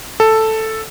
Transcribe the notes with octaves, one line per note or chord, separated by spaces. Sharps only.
A4